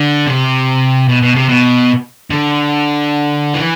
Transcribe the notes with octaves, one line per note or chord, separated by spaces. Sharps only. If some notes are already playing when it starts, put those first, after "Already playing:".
Already playing: D3
C3
B2
B2
C3
B2
D3
E3